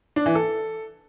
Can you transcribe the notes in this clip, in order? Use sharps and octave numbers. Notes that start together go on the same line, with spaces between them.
D4
E3
A4